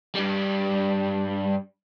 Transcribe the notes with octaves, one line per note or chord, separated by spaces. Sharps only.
G2 G3